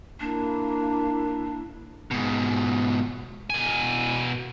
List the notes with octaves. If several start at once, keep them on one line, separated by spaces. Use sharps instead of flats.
A#3 D4 E4
G#2 B2
B2 G#5